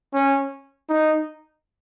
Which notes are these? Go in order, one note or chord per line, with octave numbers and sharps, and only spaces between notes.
C#4
D#4